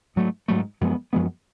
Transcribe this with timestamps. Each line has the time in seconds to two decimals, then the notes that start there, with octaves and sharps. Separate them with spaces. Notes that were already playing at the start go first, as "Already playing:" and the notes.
0.16 G#2 F#3 A3
0.48 G#2 F#3 A3
0.81 F#2 F3 G#3 B3
1.13 F#2 F3 G#3 B3